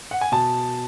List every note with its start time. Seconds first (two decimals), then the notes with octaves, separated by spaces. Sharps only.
0.11 F#5
0.21 G#5
0.32 B2 A5